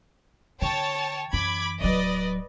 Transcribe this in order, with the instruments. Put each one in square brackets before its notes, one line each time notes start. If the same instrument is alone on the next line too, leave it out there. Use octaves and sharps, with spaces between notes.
[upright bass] D3 [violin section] C#5 G5 A5
[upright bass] F#2 E3 [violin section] B5 D6 G#6
[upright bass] D1 F#3 [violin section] B4 D5 D#5